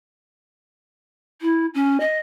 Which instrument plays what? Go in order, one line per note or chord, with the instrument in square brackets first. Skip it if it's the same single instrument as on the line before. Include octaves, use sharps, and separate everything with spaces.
[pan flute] E4
C#4
D#5